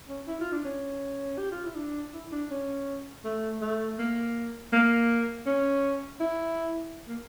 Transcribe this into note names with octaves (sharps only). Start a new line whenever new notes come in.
C#4
E4
F4
D4
C#4
G4
F4
E4
D4
E4
D4
C#4
A3
A3
A#3
A#3
C#4
E4
A#3